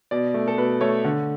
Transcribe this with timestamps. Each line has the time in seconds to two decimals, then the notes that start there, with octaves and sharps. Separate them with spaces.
0.11 B2 D5
0.34 A3
0.48 A4
0.58 B2 B4
0.81 A3 C#5
1.04 D3